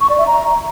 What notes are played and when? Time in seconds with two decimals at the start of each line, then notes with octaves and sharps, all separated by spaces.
0.01 C#6
0.09 D5
0.18 E5
0.27 A#5